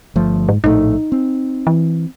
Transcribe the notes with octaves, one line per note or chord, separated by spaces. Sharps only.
G1 F3 A3
G#2
A#1 A2 A3 D#4
C4
E3